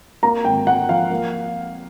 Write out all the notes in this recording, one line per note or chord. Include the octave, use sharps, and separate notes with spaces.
A#3 A#5
G#1 G5
A#3 F#5
F3 F5
A#3